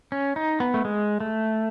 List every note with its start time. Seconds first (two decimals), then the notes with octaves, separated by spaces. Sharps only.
0.12 C#4
0.36 D#4
0.60 B3
0.74 A3
0.85 G#3
1.20 A3